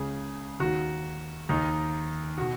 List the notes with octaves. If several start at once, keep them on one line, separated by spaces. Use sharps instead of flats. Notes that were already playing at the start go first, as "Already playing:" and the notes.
Already playing: C#2 C#3 G#4
D#2 D#3 F#4
D#2 D#3 D#4
B2 F#4